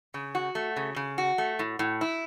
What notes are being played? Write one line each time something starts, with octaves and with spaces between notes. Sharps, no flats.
C#3
F#4
A3
C#3
C#3
F#4
A3
A2
A2
E4